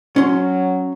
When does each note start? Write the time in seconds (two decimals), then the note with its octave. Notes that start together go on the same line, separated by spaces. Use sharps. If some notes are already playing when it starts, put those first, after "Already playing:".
0.16 F#3 C#4 C6